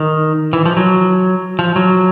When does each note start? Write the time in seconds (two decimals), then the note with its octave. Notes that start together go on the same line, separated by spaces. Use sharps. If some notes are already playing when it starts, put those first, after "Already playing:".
Already playing: D#3
0.53 E3
0.66 F3
0.77 F#3
1.59 F3
1.76 F#3